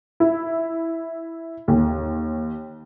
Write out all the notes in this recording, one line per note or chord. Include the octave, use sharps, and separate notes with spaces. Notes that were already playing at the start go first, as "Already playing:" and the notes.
E4
D#2